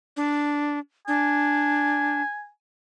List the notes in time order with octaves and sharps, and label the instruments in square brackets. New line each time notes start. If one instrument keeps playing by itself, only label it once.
[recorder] D4
[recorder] D4 [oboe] G#5